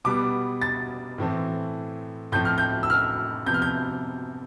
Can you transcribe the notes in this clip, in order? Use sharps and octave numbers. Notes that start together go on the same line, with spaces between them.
B2 G3 B3 D6
A6
A2 E3 A3 C4
A2 F3 C4 G6
F6
G6
E6
F6
C3 F3 B3 G6
F6
G6